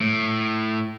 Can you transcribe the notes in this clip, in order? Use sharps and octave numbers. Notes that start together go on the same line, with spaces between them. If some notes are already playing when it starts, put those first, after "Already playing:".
A2